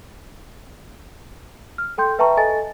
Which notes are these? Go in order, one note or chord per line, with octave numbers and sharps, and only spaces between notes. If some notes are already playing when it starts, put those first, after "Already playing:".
F6
A4 G5 C6 G6
B4 E5 G5 A5 A#5 C#6
A4 D#5 G#5 A5 A6